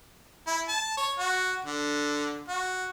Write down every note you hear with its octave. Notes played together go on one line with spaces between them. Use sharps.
E4
A5
C#5
F#4
D3
F#4